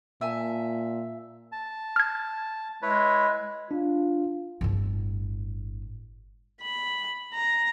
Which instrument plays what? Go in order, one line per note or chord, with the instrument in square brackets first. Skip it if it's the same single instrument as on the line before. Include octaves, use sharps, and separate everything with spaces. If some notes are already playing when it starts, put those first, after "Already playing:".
[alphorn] A#2 [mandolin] E5 G#5 A5
[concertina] A5
[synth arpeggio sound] F6 G#6
[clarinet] G#3 [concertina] E4 B4 C#5
[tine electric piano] D4 [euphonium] F4
[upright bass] G1 A2
[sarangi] B5
A#5